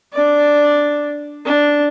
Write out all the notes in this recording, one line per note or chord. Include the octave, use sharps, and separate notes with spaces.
D4 D5
D4